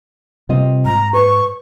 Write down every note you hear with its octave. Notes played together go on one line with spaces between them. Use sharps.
C3 G3 C4 F4 D#5
G#2 A#5
B4 C5 C#6